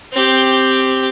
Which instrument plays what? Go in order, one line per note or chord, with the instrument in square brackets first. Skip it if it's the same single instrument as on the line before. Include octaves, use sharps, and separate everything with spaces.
[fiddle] C4 G4